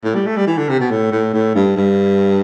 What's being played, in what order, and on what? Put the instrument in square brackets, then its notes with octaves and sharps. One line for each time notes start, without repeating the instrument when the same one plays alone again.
[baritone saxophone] A2
G3
A3
G3
E3
D3
C3
B2
A2
A2
A2
G2
G2